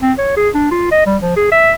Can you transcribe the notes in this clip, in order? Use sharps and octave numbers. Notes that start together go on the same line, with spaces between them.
C4
C#5
G#4
D4
F4
D#5
G3
F3
G#4
E5